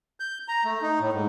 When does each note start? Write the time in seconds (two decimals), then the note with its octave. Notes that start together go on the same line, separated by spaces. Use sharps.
0.20 G6
0.48 A#5
0.65 A3
0.82 D#4
0.99 A2
1.13 G#2